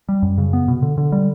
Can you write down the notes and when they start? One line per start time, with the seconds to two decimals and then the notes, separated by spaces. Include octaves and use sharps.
0.09 G3
0.22 F#2
0.38 C#3
0.53 B3
0.68 B2
0.82 D3
0.98 D3
1.12 G3